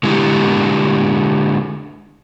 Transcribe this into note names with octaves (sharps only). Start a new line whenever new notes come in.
D3 G#3 E4 G4